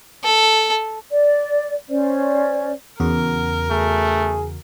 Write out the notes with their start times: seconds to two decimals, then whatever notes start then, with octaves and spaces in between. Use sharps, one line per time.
0.24 A4
1.12 D5
1.89 C#4 C5 D5
3.00 E2 C#3 F#4 A#4
3.71 A3 G#4